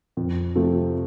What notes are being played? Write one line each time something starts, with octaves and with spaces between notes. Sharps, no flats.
F2
C3 F3 A3